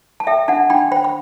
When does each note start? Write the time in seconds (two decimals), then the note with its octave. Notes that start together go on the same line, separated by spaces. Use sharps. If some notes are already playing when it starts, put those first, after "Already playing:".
0.20 A5
0.27 A4 E5 G5
0.48 D4 F#5 A5
0.70 D4 G5 B5
0.92 C5 G5 B5
1.04 B5